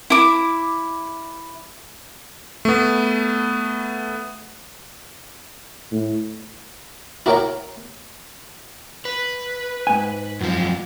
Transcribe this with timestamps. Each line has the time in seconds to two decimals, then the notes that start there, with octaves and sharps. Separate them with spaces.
0.10 E4 D6
2.65 A3 B3
5.92 A2
7.26 E4 F#4 A#4 C#5 G5 A#5
9.05 B4
9.87 G#2 G#5
10.41 F#2 F3